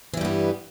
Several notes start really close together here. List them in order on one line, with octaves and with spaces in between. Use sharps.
E3 G3 G2 B3